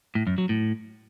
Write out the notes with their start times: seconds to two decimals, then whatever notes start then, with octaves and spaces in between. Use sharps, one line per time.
0.15 A2
0.27 F#2
0.38 F#3
0.49 A2